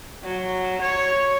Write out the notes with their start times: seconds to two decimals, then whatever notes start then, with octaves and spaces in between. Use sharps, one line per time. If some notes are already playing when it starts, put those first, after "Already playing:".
0.23 F#3
0.81 C#5